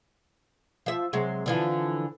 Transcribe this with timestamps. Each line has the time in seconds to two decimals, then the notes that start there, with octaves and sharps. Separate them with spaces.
0.86 F3 E5
1.13 C3 F#3 G#3
1.46 D3 E3 F3